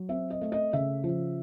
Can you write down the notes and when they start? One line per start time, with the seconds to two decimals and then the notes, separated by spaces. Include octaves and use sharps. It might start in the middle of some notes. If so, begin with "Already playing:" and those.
Already playing: F#3
0.09 C4 E5
0.30 D#5
0.41 A3
0.52 D#5
0.73 C#3 E5
1.04 F3